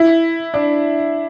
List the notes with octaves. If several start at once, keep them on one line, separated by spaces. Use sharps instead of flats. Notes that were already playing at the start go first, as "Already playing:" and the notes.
Already playing: E4
D4